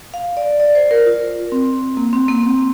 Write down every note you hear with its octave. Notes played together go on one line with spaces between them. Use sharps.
F5
D5
D5
C5
A#4
F4
C4
A#3
C4
A#3
C4